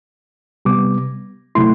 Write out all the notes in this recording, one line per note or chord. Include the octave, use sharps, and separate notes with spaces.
C3 G3 B3 D6
C3 F#3 A3 E4 C6